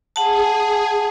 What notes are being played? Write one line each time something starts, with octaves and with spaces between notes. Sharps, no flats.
G#4 F#5 A5